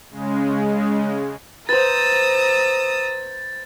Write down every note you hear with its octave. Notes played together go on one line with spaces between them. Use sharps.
C#3 G#3
B4 C5 A#5 D#6 E6 A6